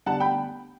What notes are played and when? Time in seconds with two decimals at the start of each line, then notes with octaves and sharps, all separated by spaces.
0.06 D3 G3 B3 D4 F#5 A5
0.20 G5 B5